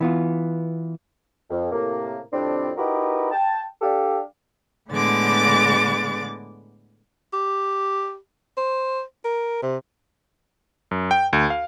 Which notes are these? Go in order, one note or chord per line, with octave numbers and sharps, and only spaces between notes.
E3 B3 F4
F2
A2 C3 A#3
F2 A2 G3 C4 D4
D#4 E4 F#4 G4 A#4 B4
G5 A5
D4 G4 A4 F5
A2 D3 G#3 B3 D6 A6
G4
C5
A#4
C3
F#2
G5
D2
F5